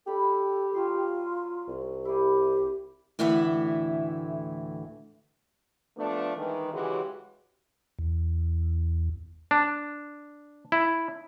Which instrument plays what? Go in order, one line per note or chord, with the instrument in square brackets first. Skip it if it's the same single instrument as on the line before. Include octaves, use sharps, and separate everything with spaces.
[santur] D4 B5 [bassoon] G4 [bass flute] A4
[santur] F#3 G#4 C6 [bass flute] F4
[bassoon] C2
[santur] E4 G#4 [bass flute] G4
[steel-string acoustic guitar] D2 A2 E3 E5 F#5
[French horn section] F3 A3 B3 D4
D#3 E3 G#3
C#3 E3 F#3 G#3 F#4 G4
[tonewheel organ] E2
[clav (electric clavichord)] D4
E4